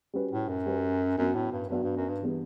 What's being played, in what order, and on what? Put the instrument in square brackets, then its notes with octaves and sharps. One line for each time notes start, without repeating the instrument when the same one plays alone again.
[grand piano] G3 C#4 F#4 B4
[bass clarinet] A2
F#2
[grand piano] G3 C#4 F#4 B4
[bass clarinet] F#2 [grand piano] F#3 B3 D4 F#4
[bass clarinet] A2
G2
[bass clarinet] G2 [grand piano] F#3 B3 D4 F#4
[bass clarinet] G2
F#2
G2
[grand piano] E3 G3 B3 D4 G4